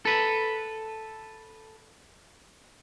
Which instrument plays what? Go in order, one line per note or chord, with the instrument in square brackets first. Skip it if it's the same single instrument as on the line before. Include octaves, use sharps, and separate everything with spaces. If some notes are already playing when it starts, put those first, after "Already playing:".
[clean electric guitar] A4 B4